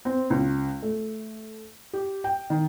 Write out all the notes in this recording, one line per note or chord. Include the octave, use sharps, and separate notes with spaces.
C4
C#2
A3
G4
G5
D#3